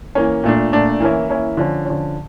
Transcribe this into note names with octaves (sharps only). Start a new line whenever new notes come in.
E3 A#3 C#4
A#2 A3 D4
A#2 A3 D4
E3 A#3 C#4 E4
E3 A#3 C#4 E4
D3 F3 C#4
D3 F3 C#4